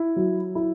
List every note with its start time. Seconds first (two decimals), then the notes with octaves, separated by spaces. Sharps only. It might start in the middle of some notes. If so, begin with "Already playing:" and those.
Already playing: E4
0.16 F#3
0.55 E4